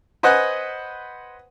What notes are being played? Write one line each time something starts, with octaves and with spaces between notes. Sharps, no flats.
B4 C5 D#5 F#5 G#5 F#6